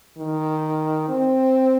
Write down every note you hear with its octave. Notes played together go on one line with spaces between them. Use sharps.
D#3
C4